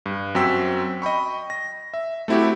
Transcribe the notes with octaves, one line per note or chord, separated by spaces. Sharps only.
G2
F#2 C4 F#4 G5 E6 B6
D#5 G5 B5 C#6
A#6
E5
A3 C4 E4 F#4 G4